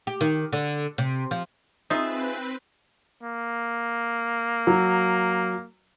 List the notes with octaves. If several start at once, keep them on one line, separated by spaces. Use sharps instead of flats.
G4
D#3
D3
C3
F3
C4 D#4 F4 G#4 B4 E5
A#3
F#3